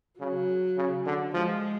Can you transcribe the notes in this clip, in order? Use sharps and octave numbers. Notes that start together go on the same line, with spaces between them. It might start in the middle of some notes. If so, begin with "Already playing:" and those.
C#3 F#3
C#3
D3
F3 G#3